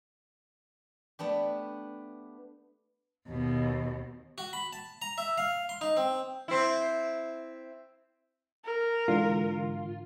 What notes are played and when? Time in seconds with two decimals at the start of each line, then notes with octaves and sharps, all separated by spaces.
1.19 A3 B3 D4 G4
3.28 D#2 B2
4.38 F#4
4.53 B5
4.73 A5
5.02 A#5
5.18 E5
5.38 F5
5.69 C6
5.81 D#4
5.97 C4
6.48 C4 E4
8.65 A#4
9.08 G#2 D3 E3 F4